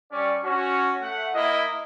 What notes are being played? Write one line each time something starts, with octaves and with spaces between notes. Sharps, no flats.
G3 C#4 D5 C#6
C#4 F#4
A3 F#5
A#3 E4 D#5